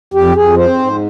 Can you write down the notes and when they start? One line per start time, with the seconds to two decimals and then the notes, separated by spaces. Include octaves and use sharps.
0.14 F2 G4
0.35 F2 G#4
0.57 C4 C5
0.79 G#2